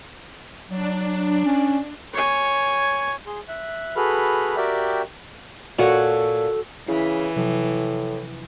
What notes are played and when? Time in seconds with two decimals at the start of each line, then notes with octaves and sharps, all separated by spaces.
0.70 F#3 D4
1.45 C#4
2.13 C#5 G#5
3.27 G#4 C6
3.48 E5 F#6
3.96 F#4 G#4 A4 B4 B5 F6
4.57 F#4 G4 A#4 D5 E5 G5
5.79 A#2 F#4 A4 C#5 F#5
6.88 C#3 E3 E4
7.37 A2 C3 F3 F#3